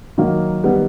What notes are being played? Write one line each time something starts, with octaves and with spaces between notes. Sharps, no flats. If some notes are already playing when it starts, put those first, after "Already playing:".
D#3 F#3 A#3
D#3 G3 B3